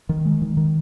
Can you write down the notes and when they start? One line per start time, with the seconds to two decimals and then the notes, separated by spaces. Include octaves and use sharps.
0.09 D#3
0.25 G#3
0.42 D#3
0.57 D#3